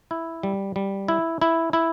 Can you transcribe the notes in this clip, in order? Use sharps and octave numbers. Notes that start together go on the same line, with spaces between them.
E4
G3
G3
E4
E4
E4